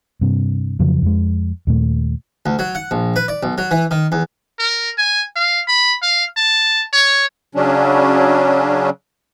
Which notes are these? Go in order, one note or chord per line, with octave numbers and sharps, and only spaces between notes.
G2 C3
F2 C#3 F3 F#3
F2 G#3
D#2 A#2 A3
D2
F#3
F#5
A#1
B4
D5
B1
F#3
E3
D#3
E2
A#4
G#5
F5
B5
F5
A5
C#5
C#3 F#3 C#4 D4